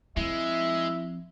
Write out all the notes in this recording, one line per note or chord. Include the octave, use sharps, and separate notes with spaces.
F3 G#3 C4 E4 E5